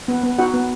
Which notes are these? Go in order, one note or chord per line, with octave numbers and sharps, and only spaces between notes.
B3
B3
D#4 F#4 F#5
B3